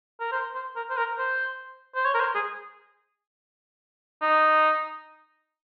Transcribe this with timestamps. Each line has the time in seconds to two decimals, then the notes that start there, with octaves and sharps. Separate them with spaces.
0.20 A#4
0.32 C5
0.54 C5
0.76 A#4
0.90 C5
0.97 A#4
1.19 C5
1.95 C5
2.05 C#5
2.15 A#4
2.20 C5
2.35 G#4
4.22 D#4